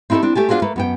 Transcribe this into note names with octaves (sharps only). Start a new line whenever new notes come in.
C4 D#4 E4 F#4 G4 A4
C4 D4
A3 G4 G#5 A5
D4 F4 F#4 G#4 C5
A3 A#3 B4
F#2 B3 G5